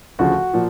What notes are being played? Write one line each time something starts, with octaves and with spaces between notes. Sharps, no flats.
D2 C#3 F3 F#4
A#2 F3